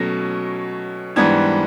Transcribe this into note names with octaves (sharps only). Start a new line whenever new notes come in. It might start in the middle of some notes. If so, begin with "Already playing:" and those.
Already playing: B2 F#3 A3 C#4 A#6
G#2 E3 G3 B3 D4 G#6